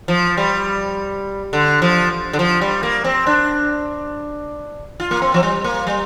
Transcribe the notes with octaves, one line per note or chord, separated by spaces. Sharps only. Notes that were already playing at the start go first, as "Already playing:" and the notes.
F3
G3
D3
F3
D3
F3
G3
A#3
C4
D4
F4
A#3
C4
F3
G3
A#3
G3